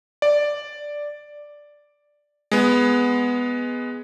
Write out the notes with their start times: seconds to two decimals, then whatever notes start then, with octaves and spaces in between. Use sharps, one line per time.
0.22 D5
2.52 G#3 B3